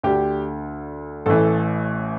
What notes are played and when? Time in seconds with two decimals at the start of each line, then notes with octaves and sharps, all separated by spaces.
0.03 D2 D3 G4
1.26 A1 A2 E3 A4